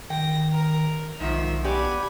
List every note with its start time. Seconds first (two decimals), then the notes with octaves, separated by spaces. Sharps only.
0.10 D#3 G5 A#6
0.52 A#4
1.20 B1 G#2 D#3 F3 E5
1.64 B3 G4 D5 G#5 B5